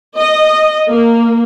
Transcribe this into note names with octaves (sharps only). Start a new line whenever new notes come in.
D#5
A#3